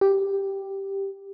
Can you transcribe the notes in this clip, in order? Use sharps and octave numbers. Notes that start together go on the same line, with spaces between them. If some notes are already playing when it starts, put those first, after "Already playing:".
G4